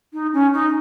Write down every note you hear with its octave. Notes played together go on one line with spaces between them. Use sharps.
D#4
C#4
D#4